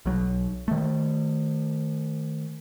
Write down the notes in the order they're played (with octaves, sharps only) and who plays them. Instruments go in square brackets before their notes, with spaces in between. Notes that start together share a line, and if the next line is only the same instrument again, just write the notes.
[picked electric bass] B1 F#3
D#3 A3